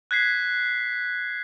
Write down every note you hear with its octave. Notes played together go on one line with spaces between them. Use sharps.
F#6 G#6 B6 C7